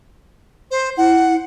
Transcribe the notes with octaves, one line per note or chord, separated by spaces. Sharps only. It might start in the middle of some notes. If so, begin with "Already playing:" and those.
C5
E4 F#5